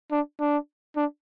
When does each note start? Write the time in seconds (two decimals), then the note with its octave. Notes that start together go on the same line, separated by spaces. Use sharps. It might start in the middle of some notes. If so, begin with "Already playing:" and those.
0.12 D4
0.40 D4
0.97 D4